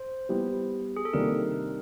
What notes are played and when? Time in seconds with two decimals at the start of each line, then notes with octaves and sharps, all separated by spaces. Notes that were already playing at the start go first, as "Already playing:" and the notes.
Already playing: C5
0.29 G3 B3 E4 G4
0.97 G#4
1.05 A4
1.13 C3 D#3 G3 A#3 D4 A#4